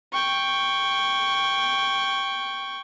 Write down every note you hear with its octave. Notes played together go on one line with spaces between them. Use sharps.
G5 C#6